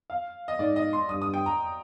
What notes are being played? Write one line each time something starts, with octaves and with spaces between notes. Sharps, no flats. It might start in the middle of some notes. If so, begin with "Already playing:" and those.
F5
D#5
G#2 D5
D#5
C6
G2 D#6
D#6
G5
A#5